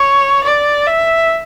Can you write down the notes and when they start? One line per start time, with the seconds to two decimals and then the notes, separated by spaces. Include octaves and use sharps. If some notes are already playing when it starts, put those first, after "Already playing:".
Already playing: C#5
0.44 D5
0.87 E5